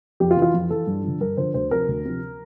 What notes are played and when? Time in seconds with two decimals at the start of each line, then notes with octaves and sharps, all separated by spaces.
0.20 F2 G4
0.31 F4
0.37 E3
0.42 F4
0.54 F2
0.70 E3 A4
0.87 G2
1.04 D3 F3
1.20 G2 A#4
1.37 D3 F3 C5
1.54 D2 C5
1.71 C3 F3 A#4
1.88 D2
2.05 C3 F3